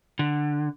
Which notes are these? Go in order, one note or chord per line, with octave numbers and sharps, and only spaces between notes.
D3